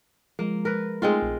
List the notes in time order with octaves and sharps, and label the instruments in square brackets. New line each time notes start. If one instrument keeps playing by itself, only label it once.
[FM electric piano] F3 G#3 [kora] A#3
[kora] A#4 B4
[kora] G#3 C4 F4 [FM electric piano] A3 D#4
[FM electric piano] A#1